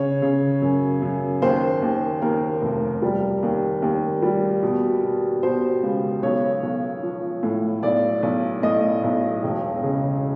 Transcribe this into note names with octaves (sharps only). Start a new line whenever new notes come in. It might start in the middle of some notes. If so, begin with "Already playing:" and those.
Already playing: C#3 C#5
C#3
F#2
F#2
D#2 C5
D#2
D#2 A#4
F1
G3
D#2
D#2
G3
B2
B2
B2 C5
C#2
B1 C#5
B1
F3
A2
B1 D5
B1
A2 D#5
B1
E1
C#3